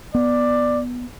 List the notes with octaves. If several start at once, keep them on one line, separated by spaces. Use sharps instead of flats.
B3 D5